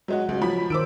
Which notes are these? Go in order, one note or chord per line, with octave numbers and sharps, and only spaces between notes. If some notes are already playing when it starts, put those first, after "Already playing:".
F#3 G#3 F#4
C#2 F#3
F3 B5 B6
D#3 C5 D6 E6 D7